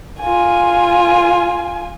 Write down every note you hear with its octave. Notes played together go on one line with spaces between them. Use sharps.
F4 G#5